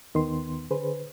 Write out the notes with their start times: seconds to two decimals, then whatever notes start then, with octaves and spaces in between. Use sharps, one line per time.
0.14 D#2 D#3 B3 C6
0.71 D3 G#4 B4 C5